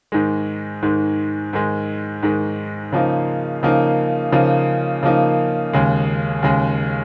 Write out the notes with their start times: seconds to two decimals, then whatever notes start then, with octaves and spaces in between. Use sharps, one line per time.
0.12 G#2 D#3 G#3
0.82 G#2 D#3 G#3
1.53 G#2 D#3 G#3
2.23 G#2 D#3 G#3
2.92 C#3 F3 A#3 D#4
3.63 C#3 F3 A#3 D#4
4.32 C#3 F3 A#3 D#4
5.03 C#3 F3 A#3 D#4
5.73 D#2 C#3 G#3
6.42 D#2 C#3 G#3